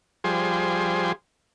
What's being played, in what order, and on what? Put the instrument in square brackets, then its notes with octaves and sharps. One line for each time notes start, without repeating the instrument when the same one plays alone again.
[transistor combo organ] F3 G3 G#4 C5